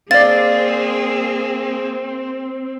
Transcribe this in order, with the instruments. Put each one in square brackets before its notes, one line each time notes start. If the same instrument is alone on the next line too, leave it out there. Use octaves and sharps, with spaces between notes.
[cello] A#3 G#4 [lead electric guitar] C4 [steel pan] D5 F5 [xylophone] A6